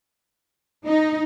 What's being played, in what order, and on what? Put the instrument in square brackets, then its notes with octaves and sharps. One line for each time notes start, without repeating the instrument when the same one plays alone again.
[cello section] D#4